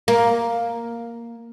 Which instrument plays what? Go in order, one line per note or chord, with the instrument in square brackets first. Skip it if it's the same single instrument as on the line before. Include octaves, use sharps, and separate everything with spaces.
[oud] A#3